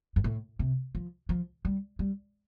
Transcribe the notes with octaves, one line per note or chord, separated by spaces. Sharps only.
G2
A2
C3
F3
F3
G3
G3